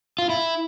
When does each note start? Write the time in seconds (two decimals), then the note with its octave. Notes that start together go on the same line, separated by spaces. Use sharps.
0.19 F4
0.29 E4